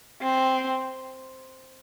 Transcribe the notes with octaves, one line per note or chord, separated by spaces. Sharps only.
C4